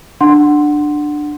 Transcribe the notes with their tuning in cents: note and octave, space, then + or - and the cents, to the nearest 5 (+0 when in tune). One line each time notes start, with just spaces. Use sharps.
D4 +15 F#5 +0 C6 +0